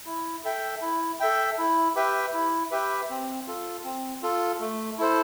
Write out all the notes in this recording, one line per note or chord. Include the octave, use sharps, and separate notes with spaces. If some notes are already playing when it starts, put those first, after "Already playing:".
E4
A4 E5 G5
E4
A4 E5 G5
E4
G4 B4 E5 G5
E4
G4 B4 E5 G5
C4
F4 A4
C4
F4 A4
A3
E4 A4 C5